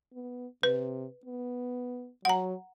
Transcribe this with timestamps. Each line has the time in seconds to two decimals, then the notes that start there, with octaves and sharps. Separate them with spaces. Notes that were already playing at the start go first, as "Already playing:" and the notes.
0.13 B3
0.63 C3 B4
1.25 B3
2.25 F#3 F#5 A#5